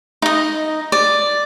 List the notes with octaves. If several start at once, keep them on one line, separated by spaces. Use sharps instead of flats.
D#4 D#5
D5